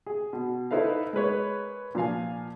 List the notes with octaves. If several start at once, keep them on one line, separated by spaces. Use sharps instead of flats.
G#4
B2
D#4 E4 A4 B4 C5 F5
G#3 A#4 B4 C#5
A#2 F3 F5 G#5